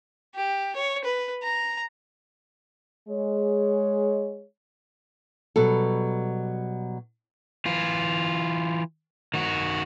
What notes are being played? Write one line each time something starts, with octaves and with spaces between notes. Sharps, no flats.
G4
C#5
B4
A#5
G#3 G#4 C#5
B2 F#3 G3 A4
E3 F4
D#3 F#4